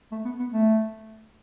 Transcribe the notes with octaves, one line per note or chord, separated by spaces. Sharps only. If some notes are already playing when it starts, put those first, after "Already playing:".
A3
B3
B3
A3